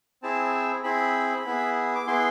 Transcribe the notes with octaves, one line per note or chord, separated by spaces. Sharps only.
C4 E4 G#4 A5
C4 E4 G#4 B5
B3 E4 G#4
D6
B3 E4 G#4 C6